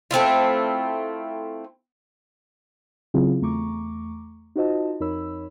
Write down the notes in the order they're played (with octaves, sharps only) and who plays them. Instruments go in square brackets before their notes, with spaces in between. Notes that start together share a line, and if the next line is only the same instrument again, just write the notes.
[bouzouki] A3 C4 E4 F4
[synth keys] C#3 F#3 C4 E4 F4 G#4
E2 A3 A#5 C#6 D6
D#4 F4 F#4 C5 D#5 A5
F2 D#4 A#4 C#5 B5 E6